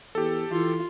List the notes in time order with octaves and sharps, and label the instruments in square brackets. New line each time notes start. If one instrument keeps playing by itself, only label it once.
[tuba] E2 [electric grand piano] G4 A4
[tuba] E3 [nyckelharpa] F4